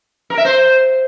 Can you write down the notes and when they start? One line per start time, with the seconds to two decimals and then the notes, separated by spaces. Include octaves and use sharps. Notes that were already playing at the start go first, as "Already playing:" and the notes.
0.30 A#4
0.37 E5
0.45 C5